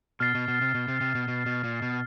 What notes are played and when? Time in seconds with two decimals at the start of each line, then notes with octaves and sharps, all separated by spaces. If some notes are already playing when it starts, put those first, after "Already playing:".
0.20 B2 F6 A6 C7
0.35 B2
0.48 B2
0.61 C3
0.75 B2
0.88 C3
1.01 C3
1.15 B2
1.28 B2
1.46 B2
1.64 A#2
1.82 B2